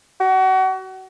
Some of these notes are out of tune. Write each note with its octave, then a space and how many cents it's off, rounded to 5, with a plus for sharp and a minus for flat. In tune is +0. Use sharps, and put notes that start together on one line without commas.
F#4 +30